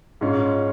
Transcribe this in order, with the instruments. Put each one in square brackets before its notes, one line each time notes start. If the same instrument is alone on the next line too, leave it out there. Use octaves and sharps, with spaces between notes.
[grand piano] G#2 G#3 C#4 F4